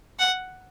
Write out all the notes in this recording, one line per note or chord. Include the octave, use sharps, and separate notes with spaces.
F#5